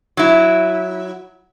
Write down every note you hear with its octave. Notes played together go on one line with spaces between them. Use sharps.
F#3 E4